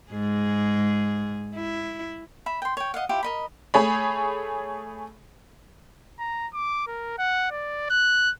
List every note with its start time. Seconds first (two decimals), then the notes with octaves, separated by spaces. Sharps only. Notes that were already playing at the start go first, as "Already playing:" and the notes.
0.12 G#2 G#4
1.55 E4
2.46 E5 B5
2.62 G5 C6
2.77 C#5 G5
2.94 D#5 F5 F#5
3.09 E4 F4 G4
3.23 A#4 D#5 B5
3.74 A3 G#4 C#5 B5
6.19 A#5
6.54 D6
6.87 A#4
7.18 F#5
7.51 D5
7.90 F#6